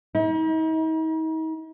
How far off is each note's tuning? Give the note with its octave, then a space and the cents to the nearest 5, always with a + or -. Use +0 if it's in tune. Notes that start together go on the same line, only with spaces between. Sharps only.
D#4 +40